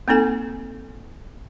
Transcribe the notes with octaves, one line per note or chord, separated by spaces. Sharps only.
A#3 C4 D#4 A4 G#5